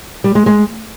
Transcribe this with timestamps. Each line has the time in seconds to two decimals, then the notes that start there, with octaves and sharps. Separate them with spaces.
0.24 G3
0.35 G#3
0.46 G#3